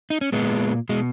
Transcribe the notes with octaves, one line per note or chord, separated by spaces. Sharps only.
D#4
C#4
A#2 G#3 B3
B2 G#3